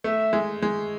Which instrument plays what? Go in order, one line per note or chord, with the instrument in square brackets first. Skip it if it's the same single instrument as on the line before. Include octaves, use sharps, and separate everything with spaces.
[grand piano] A3 [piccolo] E5
[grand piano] G#3
G#3